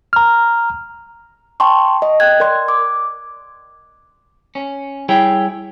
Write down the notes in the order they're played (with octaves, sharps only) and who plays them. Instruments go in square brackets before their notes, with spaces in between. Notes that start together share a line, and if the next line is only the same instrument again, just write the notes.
[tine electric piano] A#5 F6
[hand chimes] G5 A5 C6 C#6
D#5
G5 F#6 G#6
A#4 D5 C6 G#6
D6
[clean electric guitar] C#4
G3 E4 G#4 C#5 G5